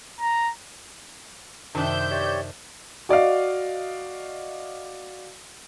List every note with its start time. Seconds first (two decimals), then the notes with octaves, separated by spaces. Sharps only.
0.20 A#5
1.75 F#2 C3 D#3 D4 C5 E5 G5 G6
2.10 G4 C#5 D5
3.09 F#4 D5 D#5 F5